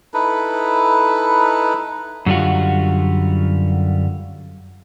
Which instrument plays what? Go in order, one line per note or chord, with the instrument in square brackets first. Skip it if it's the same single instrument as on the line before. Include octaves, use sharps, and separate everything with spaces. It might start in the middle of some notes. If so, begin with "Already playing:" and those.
[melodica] D#4 E4 A4 B4
[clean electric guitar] F#2 D3 G3 F4 F#4